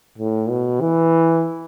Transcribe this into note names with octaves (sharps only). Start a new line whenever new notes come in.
A2
B2
E3